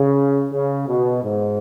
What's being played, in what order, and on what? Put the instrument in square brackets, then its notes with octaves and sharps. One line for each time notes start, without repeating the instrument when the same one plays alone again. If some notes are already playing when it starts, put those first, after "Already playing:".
Already playing: [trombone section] C#3
C#3
B2
G#2